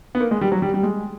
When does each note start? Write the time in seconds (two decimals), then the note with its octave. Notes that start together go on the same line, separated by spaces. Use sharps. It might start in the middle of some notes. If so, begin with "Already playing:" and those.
0.15 B3
0.21 A#3
0.31 G#3
0.41 G3
0.52 F#3
0.62 G3
0.74 G3
0.83 G#3